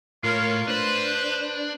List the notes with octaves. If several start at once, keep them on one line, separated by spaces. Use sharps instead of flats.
A2 F4 A#4 C#5
D4 B4 C5